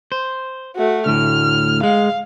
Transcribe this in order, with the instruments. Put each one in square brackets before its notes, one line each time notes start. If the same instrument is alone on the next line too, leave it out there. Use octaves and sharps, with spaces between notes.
[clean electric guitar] C5
[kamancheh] A3 F#4
[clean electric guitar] D2 A2 [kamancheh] F6
[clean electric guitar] G#3 [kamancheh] F5